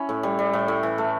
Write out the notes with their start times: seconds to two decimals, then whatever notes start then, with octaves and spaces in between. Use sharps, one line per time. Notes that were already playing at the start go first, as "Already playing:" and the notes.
Already playing: C#4 E4
0.09 A2
0.23 G3
0.39 G3
0.53 A2
0.68 A2
0.83 E3
0.98 A3